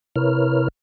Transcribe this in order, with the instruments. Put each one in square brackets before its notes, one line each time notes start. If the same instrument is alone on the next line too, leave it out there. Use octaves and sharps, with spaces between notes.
[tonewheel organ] C3 E4 A#4 B4 C#5 F6